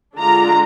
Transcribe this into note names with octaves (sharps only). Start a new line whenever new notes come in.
D3 G#3 D4 F4 A#5